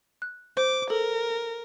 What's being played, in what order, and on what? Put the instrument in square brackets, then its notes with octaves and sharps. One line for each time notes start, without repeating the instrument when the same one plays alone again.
[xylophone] F#6
[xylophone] C5 [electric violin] D6
[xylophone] A4 [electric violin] A#4